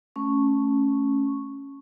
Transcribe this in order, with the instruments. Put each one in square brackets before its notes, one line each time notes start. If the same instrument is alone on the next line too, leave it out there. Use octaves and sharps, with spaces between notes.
[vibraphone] A3 C#4 C#6